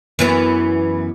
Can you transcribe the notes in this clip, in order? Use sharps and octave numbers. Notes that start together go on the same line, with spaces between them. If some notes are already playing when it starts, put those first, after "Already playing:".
F#2 E3 B3